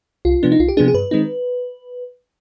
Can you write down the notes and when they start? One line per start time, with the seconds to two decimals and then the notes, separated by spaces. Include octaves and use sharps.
0.25 C2 F4
0.43 C3 F3 B3 D4
0.52 D#4
0.60 C2 F4
0.68 G4
0.77 C3 F3 B3 D4 G#4
0.88 G#4
0.94 G2 B4
1.11 D#3 G#3 C4 D#4